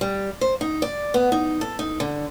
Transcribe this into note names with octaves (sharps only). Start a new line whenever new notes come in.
G3
C5
D#4
D5
B3
D#4
A4
D#4
D3